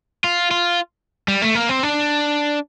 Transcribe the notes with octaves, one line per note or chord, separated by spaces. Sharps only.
F4
F4
G3
A3
A#3
C4
D4